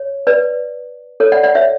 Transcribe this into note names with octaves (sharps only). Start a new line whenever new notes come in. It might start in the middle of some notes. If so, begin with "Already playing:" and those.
Already playing: C#5
B4 D5
A4 C#5
D5 F#5
D5 F#5
C#5 E5